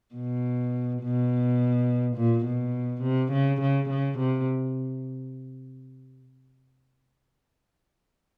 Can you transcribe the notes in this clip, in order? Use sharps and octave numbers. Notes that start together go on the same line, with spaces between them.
B2
B2
A#2
B2
C3
C#3
C#3
C#3
C3